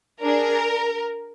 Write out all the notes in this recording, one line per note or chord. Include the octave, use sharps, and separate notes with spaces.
D4 G#4 A#4